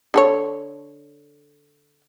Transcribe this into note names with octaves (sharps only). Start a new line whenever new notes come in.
D3 A4 C#5